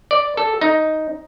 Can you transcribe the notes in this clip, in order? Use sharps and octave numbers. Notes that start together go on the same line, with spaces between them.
D5
A4
D#4